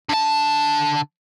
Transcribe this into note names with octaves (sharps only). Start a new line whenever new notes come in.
D3 A5